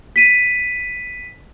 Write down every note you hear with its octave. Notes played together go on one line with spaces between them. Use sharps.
B6 D#7